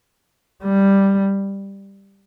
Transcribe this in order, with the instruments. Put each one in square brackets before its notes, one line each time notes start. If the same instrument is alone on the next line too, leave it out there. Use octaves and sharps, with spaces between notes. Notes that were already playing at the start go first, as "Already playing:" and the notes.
[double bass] G3